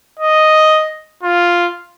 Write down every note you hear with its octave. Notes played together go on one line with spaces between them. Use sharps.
D#5
F4